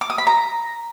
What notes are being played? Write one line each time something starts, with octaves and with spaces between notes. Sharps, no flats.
D6
D#6
B5
A#5